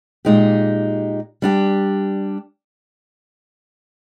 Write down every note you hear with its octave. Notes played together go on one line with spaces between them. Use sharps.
A#2 G#3 D#4 G4
G3 D4 G4